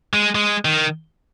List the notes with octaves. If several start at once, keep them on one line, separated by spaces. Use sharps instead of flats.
G#3
G#3
D#3